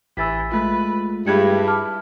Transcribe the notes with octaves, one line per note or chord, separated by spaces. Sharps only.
A1 E3 E6 A6 B6
G#3 A3 F4 B4
G2 E4 G#4 G#6 C#7
A5 D6 F6